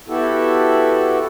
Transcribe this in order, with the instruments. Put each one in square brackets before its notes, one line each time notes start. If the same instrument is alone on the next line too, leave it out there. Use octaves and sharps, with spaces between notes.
[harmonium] B3 E4 F#4 G4 A4